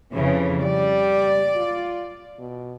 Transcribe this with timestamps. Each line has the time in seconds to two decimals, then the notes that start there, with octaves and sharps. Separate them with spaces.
0.13 F2 C#3 E3 C#4
0.62 G3 D5
1.56 F4
2.39 B2